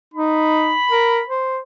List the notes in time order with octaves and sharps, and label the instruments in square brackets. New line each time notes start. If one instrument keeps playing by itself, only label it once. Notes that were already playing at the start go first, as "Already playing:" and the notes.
[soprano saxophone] D#4 [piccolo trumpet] B5
[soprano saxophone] A#4
C5